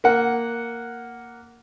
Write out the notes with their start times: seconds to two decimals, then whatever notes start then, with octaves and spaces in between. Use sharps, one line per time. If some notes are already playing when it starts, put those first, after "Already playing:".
0.04 A#3 F#5